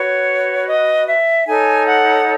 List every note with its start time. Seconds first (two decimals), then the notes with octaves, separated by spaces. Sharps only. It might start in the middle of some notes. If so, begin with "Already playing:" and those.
Already playing: F#4 B4 C#5
0.67 D#5
1.06 E5
1.46 D#4 A4 C#5 G#5
1.86 F#5